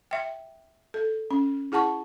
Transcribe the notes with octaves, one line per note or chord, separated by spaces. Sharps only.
E5 G5
A4
C#4
E4 G#4 F#5 A5 C#6